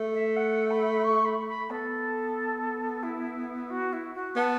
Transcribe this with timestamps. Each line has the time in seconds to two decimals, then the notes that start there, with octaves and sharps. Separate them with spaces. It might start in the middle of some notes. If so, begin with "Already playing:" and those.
Already playing: A3
0.14 E5
0.36 F#5
0.70 B5
1.04 C#6
1.25 B5
1.48 B5
1.70 B3 A4
3.03 E4
3.70 F#4
3.93 E4
4.14 F#4
4.36 B3 A5